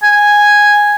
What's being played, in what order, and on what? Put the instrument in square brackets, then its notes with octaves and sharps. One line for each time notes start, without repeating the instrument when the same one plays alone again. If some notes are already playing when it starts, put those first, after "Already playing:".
[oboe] G#5